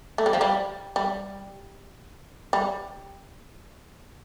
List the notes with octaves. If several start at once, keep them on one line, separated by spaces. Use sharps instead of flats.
A3
G3
F3
G3
G3
G3